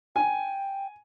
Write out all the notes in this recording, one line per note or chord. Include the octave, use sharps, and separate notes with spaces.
G5 G#5